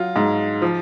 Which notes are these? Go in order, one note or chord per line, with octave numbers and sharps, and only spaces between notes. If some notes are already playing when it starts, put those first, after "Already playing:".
Already playing: F#3 F4
G#2
F3